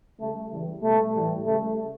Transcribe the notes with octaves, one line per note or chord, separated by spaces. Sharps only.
C#3 G3 A3
C#3 E3 G3
B2 G3 A3
A2 E3 G3
C#3 G3 A3